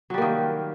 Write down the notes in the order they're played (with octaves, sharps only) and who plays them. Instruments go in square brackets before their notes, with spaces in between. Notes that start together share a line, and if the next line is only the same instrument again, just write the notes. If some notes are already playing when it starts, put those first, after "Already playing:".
[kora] F#3
G3
A#3
D#3